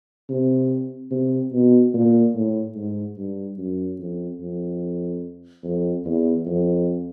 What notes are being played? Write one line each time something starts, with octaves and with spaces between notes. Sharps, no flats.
C3
C3
B2
A#2
A2
G#2
G2
F#2
F2
F2
F2
E2
F2